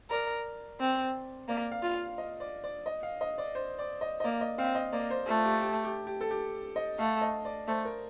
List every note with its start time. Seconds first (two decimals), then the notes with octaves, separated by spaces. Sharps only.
0.11 A#4 D5
0.80 C4
1.49 A#3 D5
1.72 F5
1.83 F4
1.94 F5
2.18 D#5
2.40 D5
2.64 D5
2.86 D#5
3.03 F5
3.21 D#5
3.38 D5
3.55 C5
3.79 D5
4.01 D#5
4.20 D#5
4.24 A#3 D5
4.41 D#5
4.58 C4 F5
4.75 D#5
4.92 A#3 D5
5.10 C5
5.27 A3 F4
5.44 G4
5.61 G4
5.84 G4
6.07 G4
6.21 A4
6.31 G4
6.76 D#5
6.99 A3 F5
7.21 D#5
7.45 D5
7.68 A3 C5
7.85 A#4